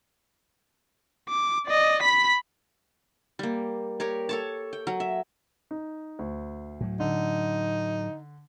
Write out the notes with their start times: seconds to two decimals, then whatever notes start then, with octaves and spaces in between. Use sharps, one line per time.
1.29 D6
1.67 D5 D#5
2.02 B5 B6
3.39 G3 A#3
4.00 G4 A#4 C#5
4.29 A4 C#5 A5
4.73 G5
4.87 F#3
5.00 E5
5.71 D#4
6.19 D2
6.81 A2 F#3
7.00 D3 D#4